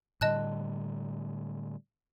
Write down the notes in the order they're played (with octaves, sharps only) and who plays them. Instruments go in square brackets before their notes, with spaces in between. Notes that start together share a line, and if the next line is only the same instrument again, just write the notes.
[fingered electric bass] A2 D3 G3 [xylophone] D#5 A5 F#6